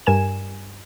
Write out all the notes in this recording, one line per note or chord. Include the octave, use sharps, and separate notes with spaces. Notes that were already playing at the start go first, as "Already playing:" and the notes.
G2 A#4 G#5 E7